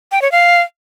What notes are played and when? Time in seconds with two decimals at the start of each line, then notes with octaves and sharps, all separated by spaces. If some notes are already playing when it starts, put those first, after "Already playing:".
0.12 G5
0.22 C#5
0.32 F5